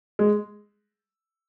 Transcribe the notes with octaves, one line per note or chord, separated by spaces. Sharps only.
G#3